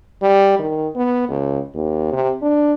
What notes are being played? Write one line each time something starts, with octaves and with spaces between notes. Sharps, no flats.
G3
D#3
B3
C#2
D#2
C3
D4